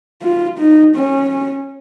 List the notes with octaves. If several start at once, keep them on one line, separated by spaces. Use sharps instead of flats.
F4
D#4
C#4